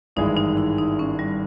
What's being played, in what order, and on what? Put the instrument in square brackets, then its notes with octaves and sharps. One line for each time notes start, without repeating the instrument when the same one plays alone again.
[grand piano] G#1 G2 E3 G#3 [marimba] D#4
[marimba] D#4
E4
D#4
C#4
G3